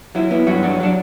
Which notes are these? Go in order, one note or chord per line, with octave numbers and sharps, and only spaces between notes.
F#3 E4
B3 E4
G2 F#3 F#4
F#3 D4 F#4
F#3 D4